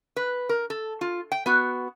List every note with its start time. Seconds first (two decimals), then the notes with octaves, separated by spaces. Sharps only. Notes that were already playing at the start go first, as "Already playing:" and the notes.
0.16 B4
0.49 A#4
0.70 A4
1.01 F4
1.32 G5
1.46 B3 F#4